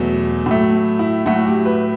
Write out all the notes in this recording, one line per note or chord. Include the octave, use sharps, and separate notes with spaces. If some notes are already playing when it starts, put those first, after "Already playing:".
Already playing: E2 B2 F#3 A3
A2 F#3 A3
E4
A2 F#3 A3 F#4
G4
B4